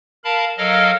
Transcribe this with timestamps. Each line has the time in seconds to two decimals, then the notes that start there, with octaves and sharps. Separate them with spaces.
0.24 A#4 F5 A5 B5
0.58 F#3 A4 A#4 D#5 F5 F6